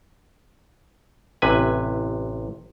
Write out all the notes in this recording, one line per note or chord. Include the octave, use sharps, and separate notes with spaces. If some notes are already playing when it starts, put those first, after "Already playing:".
A1 C3 B4 G#5